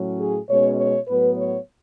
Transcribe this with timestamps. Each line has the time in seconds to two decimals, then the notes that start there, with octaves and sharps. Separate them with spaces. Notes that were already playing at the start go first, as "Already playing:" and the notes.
Already playing: A2 F#3 C#4
0.18 G#4
0.49 B2 G#3 C#4 C#5
0.78 C#5
1.08 A2 F#3 B3 B4
1.38 C#5